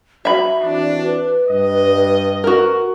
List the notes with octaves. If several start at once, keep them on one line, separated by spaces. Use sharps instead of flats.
F#4 E5 B5
E3 C4 D4
B4
G2 D#5
F#4 A#4